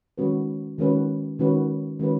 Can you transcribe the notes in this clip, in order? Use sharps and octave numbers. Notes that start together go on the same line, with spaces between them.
D#3 G#3 C#4 F#4 B4
D#3 G#3 C#4 F#4 B4
D#3 G#3 C#4 F#4 B4
D#3 G#3 C#4 F#4 B4